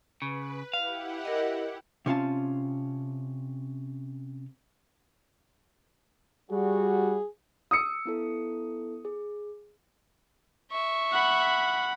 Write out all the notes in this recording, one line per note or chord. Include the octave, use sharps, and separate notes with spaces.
C#3 B4
E4 G4 F5 F#5
A#4 D#5
C3 C#4 F4 A5
G3 F#4 G#4
D#6 E6 C#7
B3 E4 A4
G#4
E5 C#6
F#5 B5